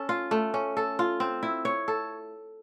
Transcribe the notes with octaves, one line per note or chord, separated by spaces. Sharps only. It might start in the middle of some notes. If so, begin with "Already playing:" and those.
Already playing: C#4 A4
F4
A3
C#4
A4
F4
C4
E4
C#5
A4